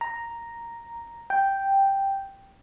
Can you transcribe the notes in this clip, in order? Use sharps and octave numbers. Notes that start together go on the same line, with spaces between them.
A#5
G5